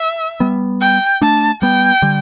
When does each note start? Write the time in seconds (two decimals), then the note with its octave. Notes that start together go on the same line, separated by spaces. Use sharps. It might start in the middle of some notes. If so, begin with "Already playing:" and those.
Already playing: E5
0.40 G3 B3
0.81 G5
1.22 A3 D4 A5
1.62 G3 B3 G5
2.02 D3 G3